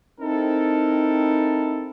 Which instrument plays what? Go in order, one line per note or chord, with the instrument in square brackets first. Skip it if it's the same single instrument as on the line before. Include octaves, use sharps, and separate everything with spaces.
[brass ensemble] C4 D#4 E4 A4 A#4